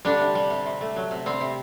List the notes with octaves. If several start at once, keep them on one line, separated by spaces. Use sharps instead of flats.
D3 G3 D4
C3
G3
C3
C3
A3
F#3
C3
G3 C4
C3